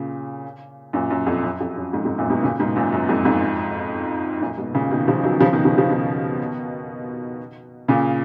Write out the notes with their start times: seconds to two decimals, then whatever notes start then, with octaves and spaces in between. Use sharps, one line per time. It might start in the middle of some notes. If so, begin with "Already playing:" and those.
Already playing: A#2 C#3
0.93 F#2 A#2
1.10 F#2
1.27 F2
1.43 F#2
1.61 F2
1.77 F#2
1.93 F2 G#2
2.05 F2 G#2
2.18 F#2 A#2
2.30 G#2 B2
2.43 A#2 C#3
2.59 G#2 B2
2.76 F#2 A#2
2.92 F#2
3.09 F2 G#2
3.25 F2 G#2
4.41 F#2 A#2
4.58 G#2 B2
4.74 A#2 C#3
4.91 B2 D#3
5.08 C#3 F3
5.24 D#3 F#3
5.41 C#3 F3
5.53 B2 D#3
5.65 C#3 F3
5.78 C#3 F3
5.90 B2 D#3
7.88 A#2 C#3